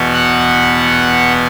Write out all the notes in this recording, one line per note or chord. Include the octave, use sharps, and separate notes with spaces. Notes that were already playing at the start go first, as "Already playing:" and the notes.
Already playing: E2 B2 B3
F#5